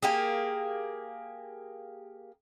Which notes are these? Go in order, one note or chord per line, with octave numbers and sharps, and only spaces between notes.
A#3 G4 G#4